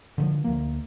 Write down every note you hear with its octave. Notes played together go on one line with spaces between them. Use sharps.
D3 D#3 F3
D2 A#3